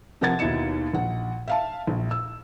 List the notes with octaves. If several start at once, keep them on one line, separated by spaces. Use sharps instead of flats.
C3 F3 A#4 F#5 G#6 A6
D#2 B2 D#4 E4 C#7 E7
A#1 F#5
E5 F5 A5
A#1
E6